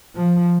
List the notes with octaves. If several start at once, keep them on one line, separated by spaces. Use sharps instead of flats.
F3